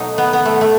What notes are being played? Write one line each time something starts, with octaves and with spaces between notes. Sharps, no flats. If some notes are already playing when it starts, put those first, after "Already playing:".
Already playing: B2 F#3 A3 D#4
B3
B3
A3
A3